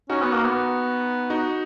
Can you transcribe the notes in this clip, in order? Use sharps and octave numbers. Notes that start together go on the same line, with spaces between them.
C#4 D#4 F#4
B3
A#3
B3
D#4 F#4